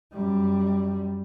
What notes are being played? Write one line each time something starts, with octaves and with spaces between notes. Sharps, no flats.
F#2 G3